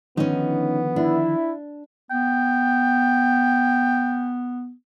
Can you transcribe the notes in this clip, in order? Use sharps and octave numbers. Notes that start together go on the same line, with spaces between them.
D3 D#3 F3 B3 C#4 D#4
D4 E4
B3 G5